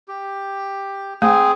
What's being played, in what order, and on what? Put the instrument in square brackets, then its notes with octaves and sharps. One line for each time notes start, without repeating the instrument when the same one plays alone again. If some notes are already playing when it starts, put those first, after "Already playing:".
[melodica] G4
[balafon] A3 [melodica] C4 G#4